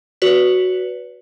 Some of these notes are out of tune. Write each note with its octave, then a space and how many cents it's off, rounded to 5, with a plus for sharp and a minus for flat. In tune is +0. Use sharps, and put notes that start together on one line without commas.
F#4 +0 B4 +0 D5 -40